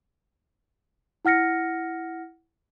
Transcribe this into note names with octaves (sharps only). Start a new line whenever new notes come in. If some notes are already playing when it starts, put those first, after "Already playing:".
E4 F#5 F6 A#6 C#7